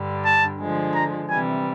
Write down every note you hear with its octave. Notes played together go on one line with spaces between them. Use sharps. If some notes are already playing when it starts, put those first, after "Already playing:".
Already playing: G2 D3 G3
A5
D3 F3 G#3
A#5
C3 E3 G3 G#5